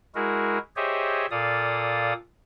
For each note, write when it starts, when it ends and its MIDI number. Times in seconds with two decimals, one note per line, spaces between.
0.15 0.58 56
0.15 0.58 64
0.15 0.58 66
0.15 0.58 68
0.15 0.58 70
0.76 1.26 67
0.76 1.26 68
0.76 1.26 72
0.76 1.26 73
0.76 1.26 75
0.76 1.26 76
1.31 2.13 46
1.31 2.13 69
1.31 2.13 74
1.31 2.13 77
1.31 2.13 87